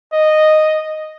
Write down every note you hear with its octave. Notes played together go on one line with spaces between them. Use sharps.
D#5